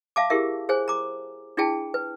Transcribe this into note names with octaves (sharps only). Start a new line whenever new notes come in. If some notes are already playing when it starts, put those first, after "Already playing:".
E5 F5 A5 D6
E4 G4 G#4 A#4 E5
G#4 C5 C#5 G#5
A#5 D6
D4 E4 F4 G#4 G5 A5
B4